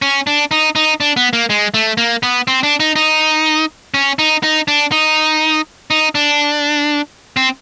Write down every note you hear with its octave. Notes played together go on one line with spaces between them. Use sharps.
C#4
D4
D#4
D#4
D4
B3
A#3
G#3
A3
A#3
B3
C4
D4
D#4
D#4
C#4
D#4
D#4
D4
D#4
D#4
D4
C4